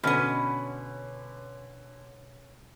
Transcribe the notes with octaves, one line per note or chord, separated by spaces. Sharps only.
B2 D3 C#4 B4 D#5